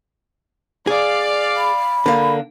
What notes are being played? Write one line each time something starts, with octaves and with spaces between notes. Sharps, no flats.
G#4 D5 F5
B5
D3 A#3